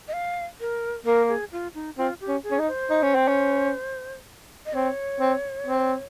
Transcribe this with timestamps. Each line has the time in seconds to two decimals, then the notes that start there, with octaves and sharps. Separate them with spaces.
0.08 D#5
0.13 F5
0.60 A#4
1.06 A#3 A#4
1.29 G#4
1.52 F4
1.74 D#4
1.98 C4 F4
2.21 G4
2.28 C#4
2.43 G#4
2.51 C#4
2.59 D#4
2.68 C5
2.90 D#4
3.03 C#4
3.15 C4
3.28 C#4
4.66 D#5
4.74 C4 C#5
5.20 C4
5.66 C4